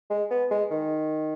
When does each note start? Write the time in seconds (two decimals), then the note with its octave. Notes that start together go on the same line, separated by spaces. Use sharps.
0.10 G#3
0.30 B3
0.50 G#3
0.71 D#3